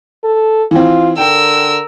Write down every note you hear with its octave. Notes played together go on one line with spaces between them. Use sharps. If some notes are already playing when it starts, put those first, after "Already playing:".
A4
E3 C4 F4
D3 A#4 G5 E6